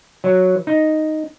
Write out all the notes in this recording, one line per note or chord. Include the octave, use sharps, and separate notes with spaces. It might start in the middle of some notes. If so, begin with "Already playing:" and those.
F#3
D#4